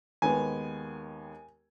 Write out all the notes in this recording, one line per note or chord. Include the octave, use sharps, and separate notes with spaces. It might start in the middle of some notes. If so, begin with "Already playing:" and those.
D#2 D#3 G#3 B3 G#5